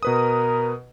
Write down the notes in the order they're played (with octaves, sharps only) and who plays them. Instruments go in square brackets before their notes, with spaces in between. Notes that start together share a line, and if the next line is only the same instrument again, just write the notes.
[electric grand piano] B2 B4 D#6 [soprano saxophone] A#4